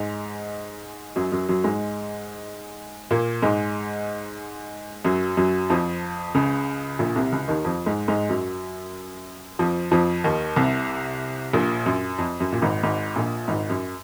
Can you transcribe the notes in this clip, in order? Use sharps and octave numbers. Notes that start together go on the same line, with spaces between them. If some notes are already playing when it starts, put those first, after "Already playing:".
Already playing: G#2 G#3
F#2 F#3
F#2 F#3
F#2 F#3
G#2 G#3
A#2 A#3
G#2 G#3
F#2 F#3
F#2 F#3
F2 F3
C#2 C#3
A#1 A#2
C2 C3
C#2 C#3
D#2 D#3
F2 F3
G#2 G#3
G#2 G#3
F#2 F#3
F2 F3
F2 F3
D#2 D#3
C2 C3
A#1 A#2
F#2
F2
F#2
A#2
G#1 G#2
G#1 G#2
A#1 A#2
G#1 G#2
F#2